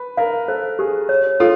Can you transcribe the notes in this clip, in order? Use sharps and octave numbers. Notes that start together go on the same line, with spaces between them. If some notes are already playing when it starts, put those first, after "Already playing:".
Already playing: B4
A#4 F5
A4 C5
G4 G#4
C#5
F4 A4